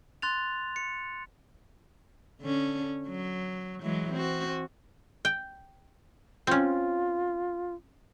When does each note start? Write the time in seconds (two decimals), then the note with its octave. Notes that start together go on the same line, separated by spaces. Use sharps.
0.22 C6 F#6 A6 F7
0.76 C#7
2.41 D3 C#4
3.07 F#3
3.82 E3 F#3 G#3
4.12 C4 F#4
5.25 G5
6.47 C4 C#4 F4